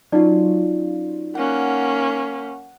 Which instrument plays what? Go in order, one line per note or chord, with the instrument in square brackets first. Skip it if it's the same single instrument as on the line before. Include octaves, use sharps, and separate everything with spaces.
[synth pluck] F#3 C#4 F4 [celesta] D#4 D5
[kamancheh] A#3 C#4 [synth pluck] F#5